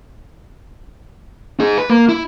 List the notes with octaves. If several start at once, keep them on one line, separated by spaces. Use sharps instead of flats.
D#4 G#4
B4
A#3
E4